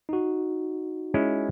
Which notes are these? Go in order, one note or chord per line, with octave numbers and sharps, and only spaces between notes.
D#4 F#4
G#3 C#4 E4